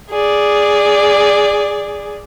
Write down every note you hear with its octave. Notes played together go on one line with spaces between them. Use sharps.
G#4 D5